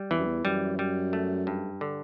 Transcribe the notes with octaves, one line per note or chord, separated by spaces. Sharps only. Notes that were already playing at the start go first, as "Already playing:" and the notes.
Already playing: G3
E2 E3
F#2
E2
F#2 G3
G3
A3
G2
D3